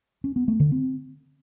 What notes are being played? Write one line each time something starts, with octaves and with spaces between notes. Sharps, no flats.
C#4
B3
A3
D3
C4